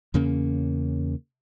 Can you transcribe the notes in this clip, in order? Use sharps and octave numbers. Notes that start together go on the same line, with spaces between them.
E2 C#3 A#3 C#4